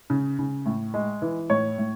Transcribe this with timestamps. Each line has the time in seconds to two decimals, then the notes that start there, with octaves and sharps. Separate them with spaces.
0.10 C#3
0.39 C#3
0.66 A2
0.94 G#3
1.22 E3
1.50 A2 C#5
1.78 A2